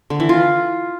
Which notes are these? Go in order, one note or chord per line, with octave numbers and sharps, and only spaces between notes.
D3
E3
F4